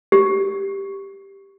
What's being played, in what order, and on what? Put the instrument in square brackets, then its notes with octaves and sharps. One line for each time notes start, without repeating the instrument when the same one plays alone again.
[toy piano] G4